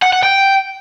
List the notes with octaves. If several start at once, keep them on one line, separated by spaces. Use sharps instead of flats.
F#5
F#5
G5